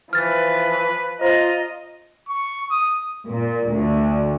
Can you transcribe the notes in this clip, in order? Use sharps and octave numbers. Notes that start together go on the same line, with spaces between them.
E3 F3 B4 F6 A6
F4 C5 D#5 A#5
C#6
D#6
A#2
D2